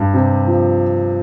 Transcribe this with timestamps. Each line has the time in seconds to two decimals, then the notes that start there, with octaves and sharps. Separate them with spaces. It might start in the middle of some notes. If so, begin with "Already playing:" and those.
Already playing: G2
0.13 C3
0.47 F3